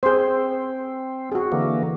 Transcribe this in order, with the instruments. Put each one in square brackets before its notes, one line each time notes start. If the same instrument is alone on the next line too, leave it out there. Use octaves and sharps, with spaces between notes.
[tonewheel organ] C4 [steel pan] G#4 C5
[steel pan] F#4 G#4
[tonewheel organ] D3 E3 A#3